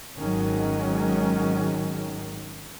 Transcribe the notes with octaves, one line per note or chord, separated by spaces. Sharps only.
G#1 G#2 D#3 F#3 G#3 C#4